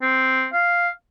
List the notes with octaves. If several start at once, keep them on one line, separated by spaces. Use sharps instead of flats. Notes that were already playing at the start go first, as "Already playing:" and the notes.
C4
F5